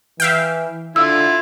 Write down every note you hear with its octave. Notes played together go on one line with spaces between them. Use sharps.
E3 E5 F5 G5
D3 E4 F4 E6